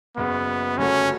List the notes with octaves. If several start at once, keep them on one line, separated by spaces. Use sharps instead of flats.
F#1 F#2 C#3 B3
G1 F#2 C#3 F#3 A3 C#4